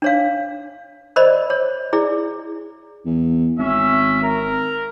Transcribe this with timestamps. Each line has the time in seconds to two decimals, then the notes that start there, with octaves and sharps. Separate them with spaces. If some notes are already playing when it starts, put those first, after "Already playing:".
0.02 D4 C#5 F5
1.16 A#4 C5 D5 D#5 B5
1.50 C#5
1.93 E4 G#4 D5
3.05 E2
3.58 G#1 C#4 E5
4.21 A#4